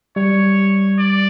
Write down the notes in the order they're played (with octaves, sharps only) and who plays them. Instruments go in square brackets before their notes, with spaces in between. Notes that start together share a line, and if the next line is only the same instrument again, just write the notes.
[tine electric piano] G3 [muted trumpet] C#5
[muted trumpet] D5